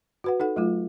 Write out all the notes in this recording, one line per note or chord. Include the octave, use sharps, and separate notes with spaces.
F#4 B4 F#5
D#4 A4 F#5
F#3 A3 F4